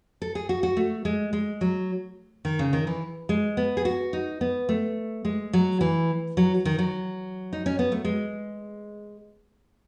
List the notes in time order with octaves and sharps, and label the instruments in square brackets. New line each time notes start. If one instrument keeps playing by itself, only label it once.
[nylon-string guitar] A4
G#4
F#4
F#4
A3
G#3
G#3
F#3
D#3
C#3
D#3
E3
G#3
B3
G#4
F#4
D#4
B3
A3
G#3
F#3
E3
F#3
D#3
F#3
D#4
C#4
B3
A3
G#3